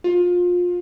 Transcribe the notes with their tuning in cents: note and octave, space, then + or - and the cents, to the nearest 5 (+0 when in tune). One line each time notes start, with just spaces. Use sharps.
F4 +25